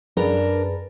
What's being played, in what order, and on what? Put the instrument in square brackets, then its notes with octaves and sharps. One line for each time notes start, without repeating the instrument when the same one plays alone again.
[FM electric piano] F#2 G#4 B4 [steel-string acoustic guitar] D4 A#4